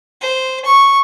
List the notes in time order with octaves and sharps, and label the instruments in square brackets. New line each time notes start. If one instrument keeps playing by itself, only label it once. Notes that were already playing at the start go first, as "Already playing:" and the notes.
[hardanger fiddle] C5
C#6